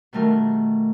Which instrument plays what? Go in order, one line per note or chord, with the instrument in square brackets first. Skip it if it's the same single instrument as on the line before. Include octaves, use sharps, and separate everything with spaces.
[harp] B2 D#3 G3 A3 D4 A#4